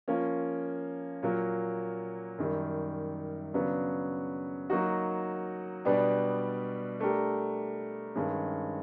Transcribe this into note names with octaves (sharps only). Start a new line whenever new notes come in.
F3 A#3 C#4
A#2 F#3 A#3
F#2 D#3 G3
C#3 F#3 B3 D4
F#3 A#3 D#4 F#4
B2 G3 B3 D4 G4
A3 D4 G4 A#4
G2 D#3 G#3 C#4